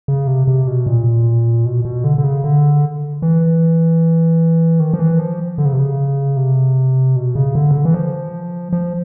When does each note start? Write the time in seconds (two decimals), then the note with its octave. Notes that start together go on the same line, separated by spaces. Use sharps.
0.08 C#3
0.27 C3
0.47 C3
0.67 B2
0.87 A#2
1.65 B2
1.85 B2
2.04 D3
2.18 D3
2.24 C#3
2.44 D3
3.22 E3
4.80 D#3
4.94 F3
4.99 E3
5.19 F3
5.58 D3
5.65 C#3
5.73 C3
5.79 C#3
6.37 C3
7.16 B2
7.35 C#3
7.55 D3
7.71 C#3
7.75 D3
7.85 E3
7.94 F3
8.73 F3